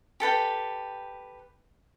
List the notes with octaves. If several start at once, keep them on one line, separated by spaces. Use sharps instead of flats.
G4 A4 B4 G5